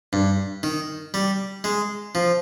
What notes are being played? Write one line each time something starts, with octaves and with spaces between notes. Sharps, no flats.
G2
D#3
G3
G#3
F3